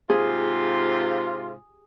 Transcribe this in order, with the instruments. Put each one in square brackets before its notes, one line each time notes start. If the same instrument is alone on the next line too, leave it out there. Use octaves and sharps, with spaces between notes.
[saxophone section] G#2 C3 F4 [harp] G#4